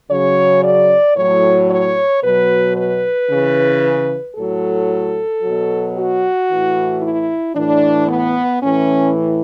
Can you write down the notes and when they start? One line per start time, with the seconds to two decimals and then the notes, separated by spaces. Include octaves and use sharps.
0.10 C#3 F#3 C#5
0.64 D5
1.17 A2 F#3 C#5
1.70 C#5
2.23 B2 F#3 B4
2.77 B4
3.30 C#3 E3
4.36 A2 F#3 A4
5.42 B2 F#3
5.96 F#4
6.49 A2 E3
7.02 E4
7.55 A2 E3 D4
8.09 B3
8.62 A2 E3 C#4